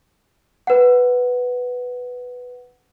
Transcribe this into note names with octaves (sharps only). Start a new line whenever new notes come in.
B4 F#5